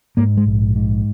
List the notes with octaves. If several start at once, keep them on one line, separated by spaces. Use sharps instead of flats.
G#2 A#3
G#3
A#1
G#2